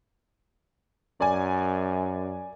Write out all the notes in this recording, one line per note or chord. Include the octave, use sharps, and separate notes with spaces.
F#2 D5 G#5